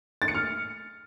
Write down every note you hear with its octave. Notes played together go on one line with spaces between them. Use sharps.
A6
C#7
F6